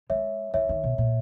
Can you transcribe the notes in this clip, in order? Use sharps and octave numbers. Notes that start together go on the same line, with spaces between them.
G#3 C#5 E5
E3 C#5 E5
D#3
B2
A#2